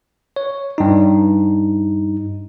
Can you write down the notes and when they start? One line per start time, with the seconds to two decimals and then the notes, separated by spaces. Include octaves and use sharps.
0.36 C#5
0.78 G2 D#4